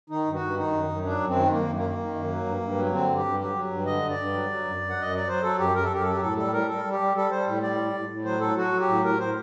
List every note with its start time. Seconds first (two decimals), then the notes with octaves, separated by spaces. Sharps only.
0.10 D#3 D#4
0.26 G2
0.34 F#4
0.41 G2
0.56 D#3 D#4
0.72 F#2
0.89 F#2
1.04 F#3 D4
1.20 F#2
1.27 C4
1.35 D#3
1.51 F#2 A#3
1.67 F#2
1.75 A#3
1.82 D#3
1.98 D#3
2.14 F#2
2.30 F#3
2.45 G2
2.61 G2
2.76 F#3
2.92 D3 C4
3.09 G2
3.16 G4
3.24 G2
3.39 F#3 G4
3.55 F#3
3.70 G2
3.86 D3 D#5
4.02 G2
4.09 D5
4.17 G2
4.33 F#3
4.50 F#3
4.65 F#2
4.81 F#2
4.90 F#5
4.97 F#2 D#5
5.11 F#3 D5
5.27 F#3 C5
5.42 F#3 A4
5.59 F#2 G4
5.75 F#2 A#4
5.83 A4
5.90 F#2 G4
6.02 F#3 A4
6.14 G4
6.21 A2 A4
6.37 G3 A4
6.53 G3 A#4
6.68 G3 A4
6.84 G3
6.92 G4
6.99 G3
7.15 G3 A4
7.31 G3 C5
7.46 A2
7.62 G3 D5
7.78 A2
7.94 A2
8.09 A2
8.25 F#3 C5
8.40 F#3 A4
8.56 F#3 F#4
8.72 F#3
8.80 G4
8.89 A2
9.04 A2 A#4
9.19 A2 C5